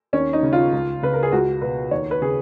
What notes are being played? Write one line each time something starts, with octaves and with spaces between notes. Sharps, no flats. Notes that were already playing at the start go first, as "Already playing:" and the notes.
D#2 C#4
D#4
C#3
F4
C#2
C#3 B4
A#4
G#4
C#2 F#4
B2 B4
D#2 C#5
B4
C#3 G#4